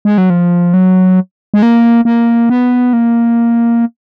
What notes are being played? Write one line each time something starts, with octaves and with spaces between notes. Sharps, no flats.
G#3
F#3
F3
F#3
G#3
A#3
A#3
B3
A#3